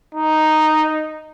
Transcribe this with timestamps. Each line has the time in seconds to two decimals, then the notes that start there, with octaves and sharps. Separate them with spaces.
0.15 D#4